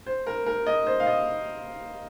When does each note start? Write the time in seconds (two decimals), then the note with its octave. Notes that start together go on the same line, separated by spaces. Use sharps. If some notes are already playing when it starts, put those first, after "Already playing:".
0.06 C5
0.27 A#4
0.46 A#4
0.67 D#5
0.87 C5
1.00 F5
1.07 D#5